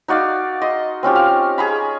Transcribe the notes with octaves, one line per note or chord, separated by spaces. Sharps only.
D#4 F#4 D5 F5
D#5 C6
C4 C#4 F4 G4
F5
G#4 A#5 B5